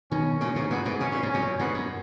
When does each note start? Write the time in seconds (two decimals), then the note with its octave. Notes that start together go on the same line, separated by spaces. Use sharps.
0.11 B2 D#3 C#4
0.41 A#2 C#3 C#4
0.56 G#2 B2
0.70 F#2 A#2 B3
0.85 G#2 B2
1.00 B2 C#4
1.12 A#2
1.23 G#2
1.30 F#2 A#2 C#4
1.59 G#2 B2 B3
1.74 F#2